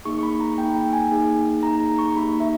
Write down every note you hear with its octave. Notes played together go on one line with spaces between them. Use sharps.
A#3 D#4 G#4 C#6
C#6
B5
A#5
A#3 D#4 G#4 G5
G5
G#5
A#3 D#4 G#4
A#3 D#4 G#4 A#5
A#5
C#6
A#3 D#4 G4 B5
E5